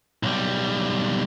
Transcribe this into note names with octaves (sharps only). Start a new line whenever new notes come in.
B1 G3